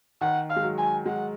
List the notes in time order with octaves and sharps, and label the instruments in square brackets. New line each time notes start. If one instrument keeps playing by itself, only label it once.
[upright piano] D#3 [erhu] F#5
[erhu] F5
[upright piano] G#3
F#3
[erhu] G#5
[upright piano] G#3 [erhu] F#5